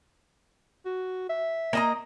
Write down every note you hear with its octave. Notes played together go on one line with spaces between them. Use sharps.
F#4
E5
A#3 D#5 A#5